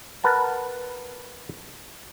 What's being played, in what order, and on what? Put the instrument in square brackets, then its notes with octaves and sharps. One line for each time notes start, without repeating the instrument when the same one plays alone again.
[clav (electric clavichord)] A#4 B4 F#5 A5